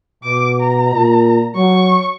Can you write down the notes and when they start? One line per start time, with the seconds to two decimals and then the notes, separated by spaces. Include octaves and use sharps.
0.24 B2 D6
0.61 A#5
0.94 A#2
1.56 F#3 C#6